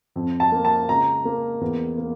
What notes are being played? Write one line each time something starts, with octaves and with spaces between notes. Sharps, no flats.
F2
A5
A#3
A5
C#2 A#5
A#3
E2
A#3